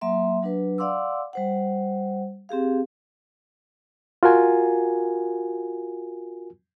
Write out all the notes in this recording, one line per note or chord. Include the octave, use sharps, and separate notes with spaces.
F#3 A#3 E5 C6
F#3 D4 B4
D5 F5 F#5 C6 D6 E6
G3 C5 F#5
C4 G4 G#4 F5
F4 F#4 A#4 G#5